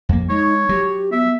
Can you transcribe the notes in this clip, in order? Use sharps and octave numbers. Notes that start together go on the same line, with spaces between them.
F2 A#3
G#3 D#4 C#5
F#3 G4
B3 E5